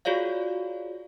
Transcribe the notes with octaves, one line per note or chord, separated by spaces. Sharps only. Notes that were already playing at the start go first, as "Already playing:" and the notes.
F4 F#4 G#4 C#5 D5 F5